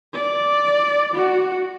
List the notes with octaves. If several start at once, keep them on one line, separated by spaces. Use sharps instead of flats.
D5
F#4